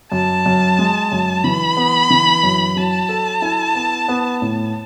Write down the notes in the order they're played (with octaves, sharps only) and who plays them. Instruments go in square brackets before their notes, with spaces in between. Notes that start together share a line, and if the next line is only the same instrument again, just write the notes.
[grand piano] F#2 [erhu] A5
[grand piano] F#2
G#3
F#2
[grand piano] E3 [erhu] B5
[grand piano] B3
E3
F#2
[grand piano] F#3 [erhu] A5
[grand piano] A4
E4
B3
B3
A2